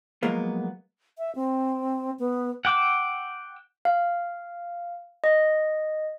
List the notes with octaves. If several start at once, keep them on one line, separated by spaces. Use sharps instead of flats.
F3 F#3 G#3 A#3 B3
E5
C4
B3
F#5 G5 D6 E6
F5
D#5